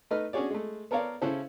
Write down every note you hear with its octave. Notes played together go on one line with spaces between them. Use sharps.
A3 D#4 B4 D#5 F6
C#4 D4 F#4 G#4 C#5 D5
G#3 A3
B3 A4 A#4 C#5 D5 F5
C#3 C#4 E4 A4 C5